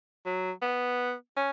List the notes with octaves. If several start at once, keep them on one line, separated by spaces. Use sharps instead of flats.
F#3
B3
C#4